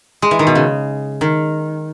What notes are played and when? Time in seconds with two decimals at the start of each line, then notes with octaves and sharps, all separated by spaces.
0.22 G#3
0.31 E3
0.39 D#3
0.47 B2
0.55 C#3
1.21 D#3